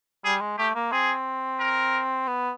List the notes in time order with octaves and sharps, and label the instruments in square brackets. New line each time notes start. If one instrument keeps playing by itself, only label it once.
[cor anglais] G3 [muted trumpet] G#4
[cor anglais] G#3
[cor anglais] A3 [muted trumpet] G4
[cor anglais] A#3
[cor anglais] C4 [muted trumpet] G#4
[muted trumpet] A#4
[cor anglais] B3